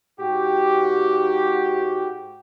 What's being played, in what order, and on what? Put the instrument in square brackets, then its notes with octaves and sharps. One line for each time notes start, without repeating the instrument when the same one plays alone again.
[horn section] G#2 F#4 G4